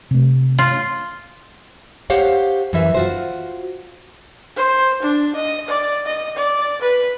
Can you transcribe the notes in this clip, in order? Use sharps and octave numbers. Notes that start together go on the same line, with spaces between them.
C3 A3
F4
G4 C5 C#5 F5 F#5
F#2 E3 E5
F4 F#4 C5
C5
D4
D#5
D5
D#5
D5
B4